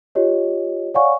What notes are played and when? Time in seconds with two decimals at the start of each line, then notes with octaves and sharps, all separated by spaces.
0.15 F4 G4 C#5 D#5
0.94 C#5 D5 F5 F#5 G#5 C#6